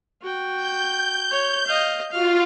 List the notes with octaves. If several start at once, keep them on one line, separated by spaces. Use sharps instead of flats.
F#4 G5
G6
C#5
D#5 F5
F4 F#4 F5